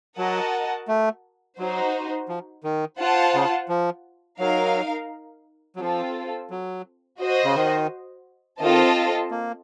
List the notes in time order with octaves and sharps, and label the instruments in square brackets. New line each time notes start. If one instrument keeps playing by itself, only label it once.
[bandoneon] F#3 [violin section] F#4 A#4 D#5 F#5 A5
[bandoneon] A3
[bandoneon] F#3 [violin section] D#4 F#4 C5
[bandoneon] F3
D#3
[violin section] F4 C5 F#5 A5
[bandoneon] C#3
F3
[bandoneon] F#3 [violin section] D#4 A#4 F5
[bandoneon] F#3
[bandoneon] F3 [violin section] C4 F4 A4
[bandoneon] F#3
[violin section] F#4 C5 D#5
[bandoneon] C#3
D#3
[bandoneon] D#3 [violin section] C4 F4 A4 D#5 A5
[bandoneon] A#3